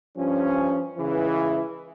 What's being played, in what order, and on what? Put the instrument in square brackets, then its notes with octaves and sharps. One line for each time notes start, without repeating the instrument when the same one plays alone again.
[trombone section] G2 F3 C#4
C#2 C#3 E3